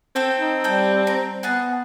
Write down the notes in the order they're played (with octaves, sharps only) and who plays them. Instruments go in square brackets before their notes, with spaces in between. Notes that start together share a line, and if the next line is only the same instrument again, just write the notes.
[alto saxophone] C4 [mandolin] A4 G5
[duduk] D#4
[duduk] G3 [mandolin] A4 G5
[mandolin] A#5
[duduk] B3 [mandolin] G#4 F#5 A5